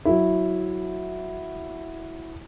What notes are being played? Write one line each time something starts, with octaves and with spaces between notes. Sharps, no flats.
F#3 E4